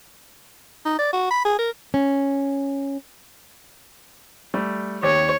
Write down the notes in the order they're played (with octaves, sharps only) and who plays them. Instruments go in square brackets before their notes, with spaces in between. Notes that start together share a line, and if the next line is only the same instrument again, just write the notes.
[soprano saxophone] D#4
D5
F#4
B5
G#4
A#4
[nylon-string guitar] C#4
[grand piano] G3 A3
[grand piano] D#2 G4 [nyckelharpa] C#5